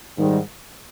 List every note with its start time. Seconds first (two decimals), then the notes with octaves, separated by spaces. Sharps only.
0.18 G#2 D#3 G3